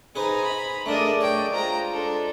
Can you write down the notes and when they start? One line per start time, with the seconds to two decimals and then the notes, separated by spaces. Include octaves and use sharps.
0.16 D#4 G#4 B4 C5 G#5 A#5
0.44 B5
0.86 A3 D4 G#4 A#4 D5 D#5
1.21 D4 C#5 G5
1.51 G#3 F4 C5 A#5
1.90 D4 A4